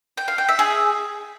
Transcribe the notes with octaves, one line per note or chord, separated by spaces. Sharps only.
G5
F5
G5
E5
G#4